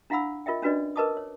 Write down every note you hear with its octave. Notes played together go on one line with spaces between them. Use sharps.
D4 E4 F5 F#5 B5 E6
F4 A#4 D#5 E5 G5
C#4 D4 F#4 B4 D5 D#5
A#4 B4 D#5 A5 D6 D#6
C#5